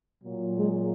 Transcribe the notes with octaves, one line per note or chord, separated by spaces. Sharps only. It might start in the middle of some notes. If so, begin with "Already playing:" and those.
A#2 F#3
G#3